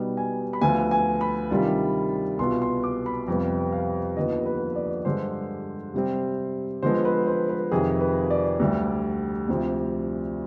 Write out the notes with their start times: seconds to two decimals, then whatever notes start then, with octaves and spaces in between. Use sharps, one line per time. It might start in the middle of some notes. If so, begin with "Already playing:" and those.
Already playing: B2 G3 B3 D#4
0.17 G#5
0.53 B5
0.61 D2 D3 F3 B3 F4 G#5
0.91 G#5
1.21 B5
1.50 C3 D#3 G3 D4 F4
2.39 C2 B2 B3 F4 C6
2.62 C6
2.84 D6
3.06 B5
3.28 F2 C3 G3 B3
3.73 F5
4.17 D#2 D3 F3 B3 D#5
4.46 B4
4.76 D5
5.05 G2 D3 G#3 C5
5.94 C3 G3 C4
6.83 D3 F3 G#3 B3 C5
7.05 B4
7.27 C5
7.49 B4
7.71 F2 C3 D#3 G#4
8.01 B4
8.30 D5
8.60 D2 D3 G3
9.49 D2 C3 F3 C4